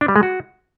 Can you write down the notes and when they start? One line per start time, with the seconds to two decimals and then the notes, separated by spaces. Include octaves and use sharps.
0.01 D4
0.08 G3
0.16 G#3
0.23 F#4